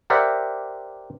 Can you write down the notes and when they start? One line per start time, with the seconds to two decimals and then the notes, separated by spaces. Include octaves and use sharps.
0.10 G4 A#4 C5 D5 E5 F#5